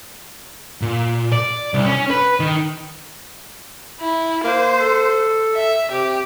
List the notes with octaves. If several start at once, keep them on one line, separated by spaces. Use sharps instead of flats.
A#2
D5
C2
C#4
B4
D#3
E4
A#3 C5
A4
E5
C3 G4